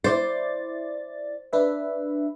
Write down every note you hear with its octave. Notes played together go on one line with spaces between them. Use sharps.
E4 C5 D5 A6
D4 B4 E5